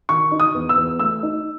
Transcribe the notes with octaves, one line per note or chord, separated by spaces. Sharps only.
D#3 C#6
D#4
D#6
E2
E6
E2
A3 E6
D#4